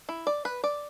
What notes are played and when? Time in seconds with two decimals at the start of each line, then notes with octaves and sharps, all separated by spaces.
0.09 E4
0.27 D5
0.45 B4
0.64 D5